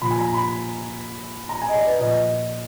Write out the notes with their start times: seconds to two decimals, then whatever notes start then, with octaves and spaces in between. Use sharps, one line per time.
0.02 A#2 F3 B5
0.11 G#5
0.18 A#5
0.34 B5
1.49 A#5
1.62 G#5
1.69 D#5
1.74 D5
1.86 B4
1.99 A#2 F3 D#5